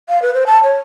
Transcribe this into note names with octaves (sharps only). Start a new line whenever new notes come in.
F5
B4
C5
A5
C#5